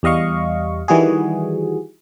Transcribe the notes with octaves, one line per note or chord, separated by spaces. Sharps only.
E2 G3 D#5 F5 C#6
D#3 E3 G3 F#4 G#4